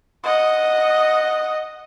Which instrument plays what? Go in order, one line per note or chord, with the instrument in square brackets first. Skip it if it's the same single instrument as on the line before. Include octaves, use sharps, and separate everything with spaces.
[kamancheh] D#5 F#5